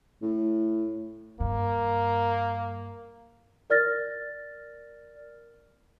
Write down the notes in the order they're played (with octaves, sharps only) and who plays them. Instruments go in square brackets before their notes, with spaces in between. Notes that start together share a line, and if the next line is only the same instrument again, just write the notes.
[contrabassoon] A2
[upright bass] G2 [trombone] A#3
[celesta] A#4 D5 F6 A6 A#6